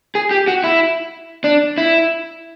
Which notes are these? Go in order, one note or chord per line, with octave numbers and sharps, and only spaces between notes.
G#4
G4
F#4
E4
D4
E4